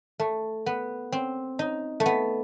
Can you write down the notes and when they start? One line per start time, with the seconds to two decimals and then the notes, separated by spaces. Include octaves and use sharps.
0.20 A3
0.66 B3
1.12 C4
1.59 D#4
2.00 A3
2.06 B3